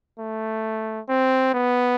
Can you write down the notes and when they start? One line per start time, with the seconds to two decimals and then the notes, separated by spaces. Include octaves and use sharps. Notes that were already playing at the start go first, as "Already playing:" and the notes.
0.19 A3
1.09 C4
1.54 B3